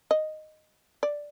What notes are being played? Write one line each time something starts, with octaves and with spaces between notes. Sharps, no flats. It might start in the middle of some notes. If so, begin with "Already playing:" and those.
D#5
D5